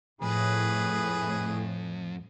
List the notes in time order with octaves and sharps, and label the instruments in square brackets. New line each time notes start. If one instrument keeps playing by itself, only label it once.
[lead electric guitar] F2 [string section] A2 [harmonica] G#4 B4